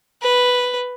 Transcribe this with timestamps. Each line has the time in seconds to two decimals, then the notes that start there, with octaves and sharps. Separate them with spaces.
0.22 B4